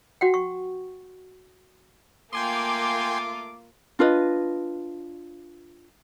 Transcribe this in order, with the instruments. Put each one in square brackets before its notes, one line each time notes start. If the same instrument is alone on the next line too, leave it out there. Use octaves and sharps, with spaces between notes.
[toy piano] F#4 F#5 G5
C#6
[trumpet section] A3 D6 [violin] A#3 F4 [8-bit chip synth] G5 G#5 C6
[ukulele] D4 F4 B4 D#5